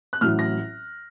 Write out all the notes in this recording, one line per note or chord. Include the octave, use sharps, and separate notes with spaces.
F#6
A1 A2 F#3 F6
A#6